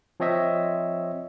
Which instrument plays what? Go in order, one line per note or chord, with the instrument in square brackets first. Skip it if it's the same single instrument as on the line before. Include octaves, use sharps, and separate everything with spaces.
[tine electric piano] F3 C4 C#5 D#5 E5